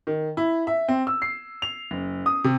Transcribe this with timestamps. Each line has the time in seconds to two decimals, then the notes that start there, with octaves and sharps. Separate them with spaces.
0.07 D#3
0.37 E4
0.67 E5
0.88 C4
1.07 E6
1.22 C7
1.62 F7
1.91 F#1
2.26 D#6
2.44 C3